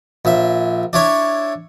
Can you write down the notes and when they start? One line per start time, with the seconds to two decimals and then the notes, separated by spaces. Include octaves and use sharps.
0.25 A#1 E5
0.93 D4 E4 C#5